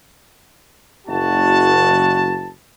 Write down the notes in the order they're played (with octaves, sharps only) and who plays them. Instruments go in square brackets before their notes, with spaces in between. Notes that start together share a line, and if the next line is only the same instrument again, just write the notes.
[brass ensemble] F#1 F#4 A5